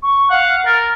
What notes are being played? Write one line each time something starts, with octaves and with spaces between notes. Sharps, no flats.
C#6
F5 F#5
A#4 A6